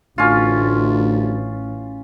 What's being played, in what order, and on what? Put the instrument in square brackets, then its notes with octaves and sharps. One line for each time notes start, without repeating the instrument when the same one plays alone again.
[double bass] A1 [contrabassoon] D2 [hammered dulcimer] C#4 F4